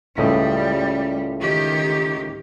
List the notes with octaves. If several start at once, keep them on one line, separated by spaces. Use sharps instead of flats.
C#2 A2 G3 D#5
D#3 G4